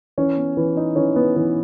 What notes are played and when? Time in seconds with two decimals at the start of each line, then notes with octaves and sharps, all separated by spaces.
0.18 E3 C#4 C#5
0.37 B3
0.57 E3
0.77 D#4
0.96 E3 C#4 C#5
1.16 B3
1.36 E3